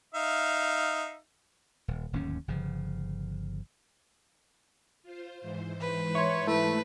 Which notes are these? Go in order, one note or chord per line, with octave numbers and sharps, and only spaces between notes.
D#4 E5 F5
D#1
D1 D#2 G#2 C#4
G1 C#3 F3
F4 C5
G#2 E3 C5
B4
C#5 E5 C6
A3 E4 B4